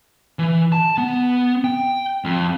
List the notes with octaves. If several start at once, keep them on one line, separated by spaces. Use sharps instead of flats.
E3
A5
B3
G5
F2